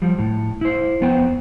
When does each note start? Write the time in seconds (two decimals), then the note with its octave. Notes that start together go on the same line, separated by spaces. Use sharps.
0.02 F3 G3
0.19 A2
0.61 E4 C5
1.01 F2 B3 C5 G5